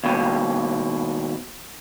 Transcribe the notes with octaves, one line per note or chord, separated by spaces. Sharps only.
D#2 B2